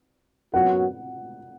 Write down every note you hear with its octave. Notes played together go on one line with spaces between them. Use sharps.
F#2 F#3 B3 F#4 F#5